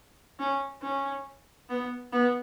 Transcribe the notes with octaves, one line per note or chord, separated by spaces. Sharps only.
C#4
C#4
B3
B3